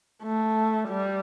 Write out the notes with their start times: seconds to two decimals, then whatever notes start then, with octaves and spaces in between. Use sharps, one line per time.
0.23 A3
0.90 G3